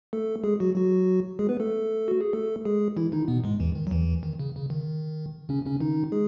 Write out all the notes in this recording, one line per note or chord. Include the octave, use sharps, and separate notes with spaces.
A3 A4
G#3 G#4
F#3 F#4
F#3 F#4
G#3 G#4
B3 B4
A3 A4
F#4
G#4
A3 A4
G#3 G#4
E3 E4
D#3 D#4
B2 B3
G#2 G#3
E2 E3
D#3
F#3
E2 E3
D#3
C#3
C#3
D#3
C#3 C#4
C#3 C#4
D#3 D#4
G#3 G#4